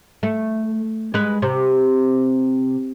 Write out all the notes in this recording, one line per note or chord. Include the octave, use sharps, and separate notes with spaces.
A3
G#3 B4
C3